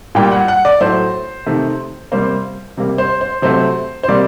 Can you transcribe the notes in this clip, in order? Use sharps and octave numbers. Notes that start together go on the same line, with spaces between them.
A#2 G3 A#3 G5
F#5
F#5
D5
A2 F#3 A3 C5
C3 D#3 A3
C3 G3 A#3 C5
C3 G3 A#3
C5
C5
C3 F#3 A3 C5
C5
C3 G3 A#3 D5